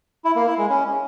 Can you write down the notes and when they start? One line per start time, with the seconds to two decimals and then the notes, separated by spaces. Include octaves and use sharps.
0.25 E4
0.36 A#3
0.47 E4
0.58 G#3
0.69 C#4